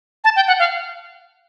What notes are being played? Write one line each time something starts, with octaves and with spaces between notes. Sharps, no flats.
A5
G5
F#5
F5